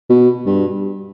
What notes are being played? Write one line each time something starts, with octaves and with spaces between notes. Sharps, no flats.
B2
G2